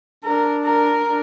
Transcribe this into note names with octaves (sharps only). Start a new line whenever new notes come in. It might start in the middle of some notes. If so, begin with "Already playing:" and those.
D4 A#4
A#4
D4